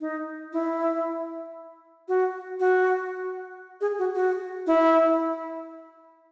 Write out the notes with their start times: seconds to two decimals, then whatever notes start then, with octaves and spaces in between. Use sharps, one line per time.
0.01 D#4
0.53 E4
2.08 F#4
2.60 F#4
3.81 G#4
3.99 F#4
4.15 F#4
4.67 E4